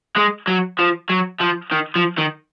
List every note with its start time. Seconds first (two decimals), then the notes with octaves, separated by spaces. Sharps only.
0.16 G#3
0.47 F#3
0.79 F3
1.10 F#3
1.41 F3
1.72 D#3
1.96 F3
2.18 D#3